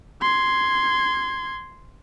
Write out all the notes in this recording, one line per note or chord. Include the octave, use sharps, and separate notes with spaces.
C6 G#6